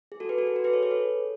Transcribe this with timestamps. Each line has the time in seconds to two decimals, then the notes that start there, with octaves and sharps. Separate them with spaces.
0.12 G#4
0.20 F#4 A4
0.29 G#4 B4
0.38 F#4 A4
0.47 G#4
0.56 F#4 A4
0.64 G#4 B4
0.73 A4 C#5
0.83 G#4 B4
0.91 A4 C#5